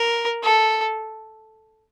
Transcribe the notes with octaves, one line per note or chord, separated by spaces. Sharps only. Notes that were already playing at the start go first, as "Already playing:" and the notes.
Already playing: A#4
A4